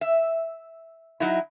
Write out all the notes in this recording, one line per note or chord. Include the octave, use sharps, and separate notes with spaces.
E5
F#3 D#4 E4